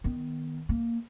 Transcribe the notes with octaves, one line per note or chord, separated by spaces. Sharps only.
D#3 B3
A#3